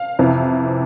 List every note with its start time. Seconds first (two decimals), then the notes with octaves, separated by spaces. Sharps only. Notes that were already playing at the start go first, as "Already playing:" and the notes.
Already playing: F5
0.19 F2 C3 E3